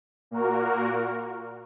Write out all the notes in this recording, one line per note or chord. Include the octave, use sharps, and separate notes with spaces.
A#2 A#3 F#4 A#4